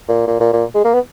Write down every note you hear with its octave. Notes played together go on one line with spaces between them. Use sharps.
A#2
A#2
A#2
A#2
G#3
A#3
B3